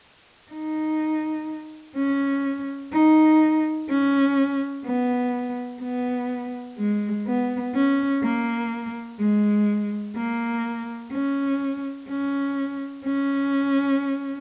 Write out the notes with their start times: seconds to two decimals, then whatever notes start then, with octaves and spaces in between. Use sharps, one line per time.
0.52 D#4
1.96 C#4
2.93 D#4
3.89 C#4
4.86 B3
5.82 B3
6.78 G#3
7.27 B3
7.75 C#4
8.23 A#3
9.20 G#3
10.16 A#3
11.13 C#4
12.09 C#4
13.05 C#4